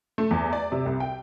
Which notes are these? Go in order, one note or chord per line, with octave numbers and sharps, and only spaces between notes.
A3
E2
D5
C3
C2
G5